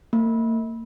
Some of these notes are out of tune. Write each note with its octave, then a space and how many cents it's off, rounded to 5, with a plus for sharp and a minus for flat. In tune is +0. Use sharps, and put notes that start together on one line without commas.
A#3 -40